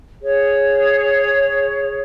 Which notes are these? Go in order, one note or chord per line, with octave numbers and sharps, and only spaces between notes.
G#4 C#5